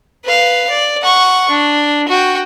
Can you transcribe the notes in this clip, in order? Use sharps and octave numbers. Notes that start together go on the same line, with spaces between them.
B4 F5
D5
F#5 C#6
D4
F#4 G5